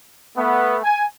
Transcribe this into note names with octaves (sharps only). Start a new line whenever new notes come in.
A3 B3
G#5